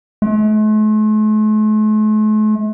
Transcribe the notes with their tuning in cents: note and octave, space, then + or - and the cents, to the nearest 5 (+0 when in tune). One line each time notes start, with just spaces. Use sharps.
A3 -45